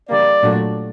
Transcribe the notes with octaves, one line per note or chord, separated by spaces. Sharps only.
D3 G3 A#3 D5
A#2 F#3 A3 D4 F#4